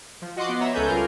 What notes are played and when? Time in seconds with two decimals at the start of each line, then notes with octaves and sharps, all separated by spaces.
0.22 F3
0.36 F#4 D#5 F#5 C6 D6
0.49 B3
0.60 C#5 E5 A#5
0.74 C#2 C#4 A4 B4 G#5 G6
0.88 G3 F4 A#4